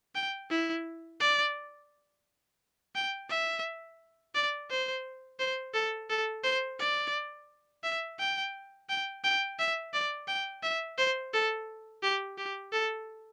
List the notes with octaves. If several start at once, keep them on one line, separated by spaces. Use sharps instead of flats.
G5
E4
D5
G5
E5
D5
C5
C5
A4
A4
C5
D5
E5
G5
G5
G5
E5
D5
G5
E5
C5
A4
G4
G4
A4